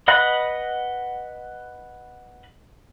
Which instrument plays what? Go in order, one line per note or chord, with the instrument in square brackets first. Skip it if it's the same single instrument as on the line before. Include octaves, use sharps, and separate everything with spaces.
[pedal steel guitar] B4 D#5 F#5 B5 F#6